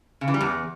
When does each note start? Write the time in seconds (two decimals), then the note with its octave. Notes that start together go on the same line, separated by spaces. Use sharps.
0.21 C#3
0.28 E3
0.34 G3
0.41 E2